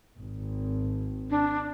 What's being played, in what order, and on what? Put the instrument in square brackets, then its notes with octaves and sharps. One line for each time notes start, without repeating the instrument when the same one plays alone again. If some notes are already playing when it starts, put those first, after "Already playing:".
[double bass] G#1
[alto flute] D4